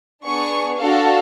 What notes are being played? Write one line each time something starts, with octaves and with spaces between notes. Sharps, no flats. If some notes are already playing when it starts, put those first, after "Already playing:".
B3 D4 G#4 C#6
D4 F#4 A4 F5